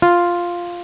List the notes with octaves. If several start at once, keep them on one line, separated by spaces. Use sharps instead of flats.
F4